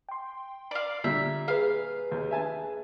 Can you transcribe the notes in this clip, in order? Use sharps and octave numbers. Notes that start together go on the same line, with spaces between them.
G5 C6
D5 F5
A#2 D3 G3 D4 E5
G#4 B4 F5
D#2
E5 G#5 A5